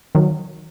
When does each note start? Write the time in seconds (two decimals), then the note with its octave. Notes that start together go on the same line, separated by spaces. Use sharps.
0.15 D#3 F#3